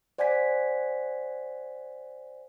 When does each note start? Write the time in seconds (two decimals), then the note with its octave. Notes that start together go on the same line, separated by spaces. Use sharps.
0.18 C5 D5 F#5 G#5 G#6 B6